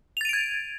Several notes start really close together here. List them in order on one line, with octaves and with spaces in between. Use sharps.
F7 A6 D#7 D7 G#6